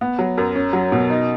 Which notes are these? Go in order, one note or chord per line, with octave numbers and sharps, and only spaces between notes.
B3
F#3
F#2
C#4
F#3
B2
D#4